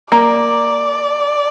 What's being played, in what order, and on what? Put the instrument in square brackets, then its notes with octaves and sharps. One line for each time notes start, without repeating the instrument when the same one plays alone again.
[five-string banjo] A#3 [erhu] D5